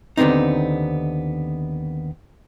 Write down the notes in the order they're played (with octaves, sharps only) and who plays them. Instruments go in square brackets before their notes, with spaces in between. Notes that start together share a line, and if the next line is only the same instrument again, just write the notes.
[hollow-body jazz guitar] D#2 D3 B3 C4 D#4